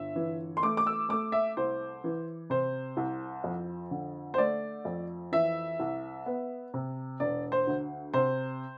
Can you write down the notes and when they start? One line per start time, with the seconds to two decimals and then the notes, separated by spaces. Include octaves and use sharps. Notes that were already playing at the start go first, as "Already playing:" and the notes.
Already playing: G1 E5
0.16 E3
0.57 C6
0.63 A3 D6
0.77 D6
0.87 E6
1.09 A3 D6
1.32 E5
1.57 C2 C5
2.04 E3
2.50 C3 C5
2.97 C2
3.44 F2
3.91 D3
4.34 C5
4.38 A3 D5
4.85 F2
5.32 E3 E5
5.79 C2
6.26 B3
6.74 C3
7.20 E1 D5
7.52 C5
7.67 D2
8.14 C3 C5